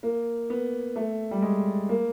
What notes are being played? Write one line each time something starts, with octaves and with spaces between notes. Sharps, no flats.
A#3
B3
A3
G3
G#3
A#3